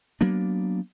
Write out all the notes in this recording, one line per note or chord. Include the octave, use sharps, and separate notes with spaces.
F#3 A#3 B3 D4